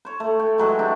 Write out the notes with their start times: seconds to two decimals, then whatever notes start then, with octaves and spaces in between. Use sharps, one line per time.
0.05 C5 C#5
0.20 A3
0.39 G5
0.58 E3 F#3 G#3
0.79 D4 G4